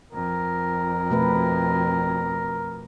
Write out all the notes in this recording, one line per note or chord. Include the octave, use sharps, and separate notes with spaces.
F2 A#4
B2 A3 B4